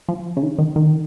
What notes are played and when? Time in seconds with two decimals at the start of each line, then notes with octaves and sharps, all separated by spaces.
0.08 F3
0.37 C#3
0.43 D#3
0.59 D#3
0.76 D#3